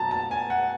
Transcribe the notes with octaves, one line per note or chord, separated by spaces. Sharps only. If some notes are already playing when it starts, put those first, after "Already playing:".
Already playing: B2 F#3 A5 A#5
A5
G#5
F#5